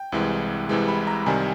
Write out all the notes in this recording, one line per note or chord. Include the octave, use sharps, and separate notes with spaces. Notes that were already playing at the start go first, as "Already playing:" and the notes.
Already playing: G5
C2 C3 E3 G#3
C2 C3 E3 G#3
B5
A#5
C2 C3 D#3 G3 G#5